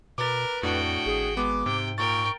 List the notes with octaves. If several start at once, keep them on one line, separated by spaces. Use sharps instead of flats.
B2 A#4 B4 D6 A6
F2 A2 D4 F#4 G5
G#1 G#4
G#3 B3 D6
G#2 C3 G5
A#2 A#4 G5 C#6 A6